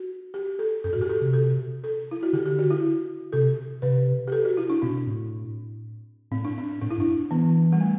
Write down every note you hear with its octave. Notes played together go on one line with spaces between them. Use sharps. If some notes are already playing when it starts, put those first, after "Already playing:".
Already playing: F#4
G4
A4
F#2 A4
F#4
A2
G4
A4
C3
A4
A4
E4
F#4
D3 G4
G4
F#4
E4
C3 A4
C3 B4
G4
A4
F#4
E4
D4
B2 C4
A2
A2 C4
D4
C4
A2 D4
E4
G2 D4
E3 B3
G3
A3